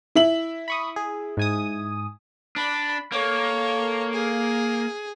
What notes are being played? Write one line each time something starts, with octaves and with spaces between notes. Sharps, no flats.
E4 E5 F#7
B5 C#6 D#6
G#4
G#2 G#5 D#6
D4 B5
A#3 A4 C#5
G#4